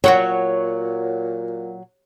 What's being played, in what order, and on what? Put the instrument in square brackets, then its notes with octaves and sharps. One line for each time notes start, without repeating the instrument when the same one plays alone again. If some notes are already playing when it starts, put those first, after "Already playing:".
[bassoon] A#2 [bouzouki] F#3 [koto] F#4 F#5 G5 [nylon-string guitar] C#5